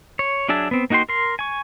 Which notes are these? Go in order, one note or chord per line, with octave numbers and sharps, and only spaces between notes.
C#5
F#3 D4 G#4 E5 A5
B3 C4
A#3 D#4 F#4 G5 C6
A#4 C6
G#5 C#6